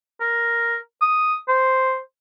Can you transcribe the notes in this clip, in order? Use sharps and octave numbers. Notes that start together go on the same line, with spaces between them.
A#4
D#6
C5